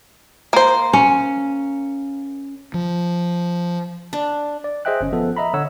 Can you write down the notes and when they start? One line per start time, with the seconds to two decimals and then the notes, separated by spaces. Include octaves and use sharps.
0.53 A#3 C5
0.93 C#4
2.74 F3
4.13 D4
4.64 D5
4.85 G#4 C5 D#5 E5 G5 F#6
5.01 G1 C#4
5.13 F3 B3 A4
5.37 D#5 E5 A#5 B5
5.54 D3 C#5 F#5 E6